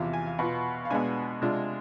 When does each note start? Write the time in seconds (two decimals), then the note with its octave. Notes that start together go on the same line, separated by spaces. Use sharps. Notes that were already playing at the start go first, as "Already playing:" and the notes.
Already playing: E2 C3 F3 F5
0.13 G#5
0.26 F5
0.39 B2 B3 F4
0.85 F5
0.90 B2 G#3 B3 D4 G#5
1.42 C3 G#3 D4 F4